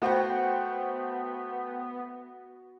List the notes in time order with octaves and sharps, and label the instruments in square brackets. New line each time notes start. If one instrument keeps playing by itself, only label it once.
[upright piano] A3 C5 G5 [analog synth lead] B3 [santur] F#4 F#5